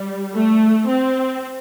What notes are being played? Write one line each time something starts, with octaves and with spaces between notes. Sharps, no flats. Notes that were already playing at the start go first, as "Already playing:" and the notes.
Already playing: G3
A3
C4